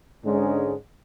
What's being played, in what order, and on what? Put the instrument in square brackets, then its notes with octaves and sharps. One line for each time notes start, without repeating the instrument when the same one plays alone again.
[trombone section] G#2 D3 G#3 C#4 D4